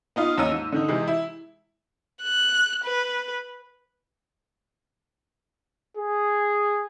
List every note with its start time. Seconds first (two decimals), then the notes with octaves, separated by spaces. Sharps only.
0.16 B3 D#4 F4
0.38 D#2 C#4 D#5 A#5 E6 D#7
0.52 G#2
0.72 D3 D#3 D#4
0.88 C3 E3 G#3
1.07 E4
2.23 F#6
2.84 B4
5.97 G#4